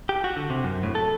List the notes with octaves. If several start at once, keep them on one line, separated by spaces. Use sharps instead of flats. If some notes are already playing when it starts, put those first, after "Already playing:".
G4
F#4
D3
C3
F#2
A2
A4